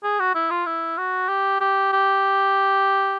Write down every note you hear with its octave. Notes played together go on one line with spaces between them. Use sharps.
G#4
F#4
E4
F4
E4
F#4
G4
G4
G4